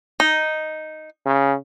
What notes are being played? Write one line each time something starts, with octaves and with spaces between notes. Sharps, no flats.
D#4
C#3